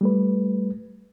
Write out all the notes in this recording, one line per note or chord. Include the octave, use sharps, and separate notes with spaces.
G3 A3 B4